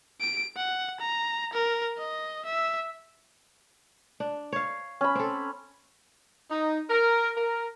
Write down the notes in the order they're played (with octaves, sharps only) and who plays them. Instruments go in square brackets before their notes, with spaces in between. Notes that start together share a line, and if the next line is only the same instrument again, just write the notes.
[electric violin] D7
F#5
A#5
A#4
D#5
E5
[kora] D4
C#5 F5
[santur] C#4 B5
[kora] C4 A4
[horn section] D#4
A#4
A#4